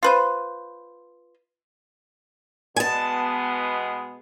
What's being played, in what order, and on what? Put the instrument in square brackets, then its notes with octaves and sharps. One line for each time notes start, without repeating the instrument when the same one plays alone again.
[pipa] F4 B4 C5
[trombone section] B2 G#3 B3 [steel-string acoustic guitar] G#5 A5